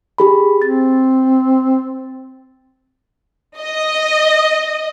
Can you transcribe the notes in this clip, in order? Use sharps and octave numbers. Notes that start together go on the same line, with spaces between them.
G4 G#4 B5
C4 A6
D#5